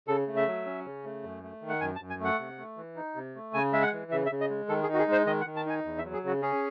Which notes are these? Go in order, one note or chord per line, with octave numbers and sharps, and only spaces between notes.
C#3 A4
A3
E5
F#3
C#4
C#3
A3
F#2
A3
D#3
F#5
F#2 G#5
A5
F#2
G#5
A3 F#5
C3
A3
E3
D#4
C3
A3
C#3 G#5
G#3 E5
F#5
E3
C#3 E5
E5
C#3
D#5
G#3
D#3 A4
G#4
D#4 F#4
G#4
G#3 C5
D#3 D#5
F#5
D#3
A5
D#4 G#5
E2
E5
F#3
G#4
C#3 F#4
C#4 G#4